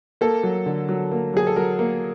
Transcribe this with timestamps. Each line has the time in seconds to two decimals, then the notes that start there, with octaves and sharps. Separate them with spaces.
0.21 A#3 A4
0.43 F#3
0.66 D3
0.89 F#3
1.11 A#3
1.34 F#3 G#4
1.47 A4
1.56 F#3 A#4
1.79 A#3